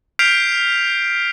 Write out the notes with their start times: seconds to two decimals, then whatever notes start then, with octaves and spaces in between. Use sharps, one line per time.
0.19 F6 G6 B6 C7 D7 F7